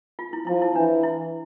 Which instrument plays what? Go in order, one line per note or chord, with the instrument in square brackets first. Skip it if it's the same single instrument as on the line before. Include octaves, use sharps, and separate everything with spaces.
[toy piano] F4
E4
[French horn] F3 [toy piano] E4
[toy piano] E4
[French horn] E3 [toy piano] D4
[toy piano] E4